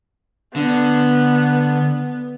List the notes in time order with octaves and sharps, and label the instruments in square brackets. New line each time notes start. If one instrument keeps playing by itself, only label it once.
[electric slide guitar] D3 [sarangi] B3